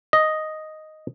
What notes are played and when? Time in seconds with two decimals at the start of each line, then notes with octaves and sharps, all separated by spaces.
0.13 D#5